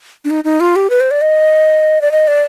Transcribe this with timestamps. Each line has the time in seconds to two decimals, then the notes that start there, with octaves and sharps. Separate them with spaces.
0.25 D4
0.30 D#4
0.44 D#4
0.60 F4
0.76 G4
0.90 B4
1.00 C5
1.11 D5
1.21 D#5
2.01 D5
2.11 D#5
2.27 D5